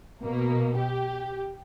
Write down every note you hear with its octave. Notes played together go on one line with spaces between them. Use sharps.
B2 A#3
G4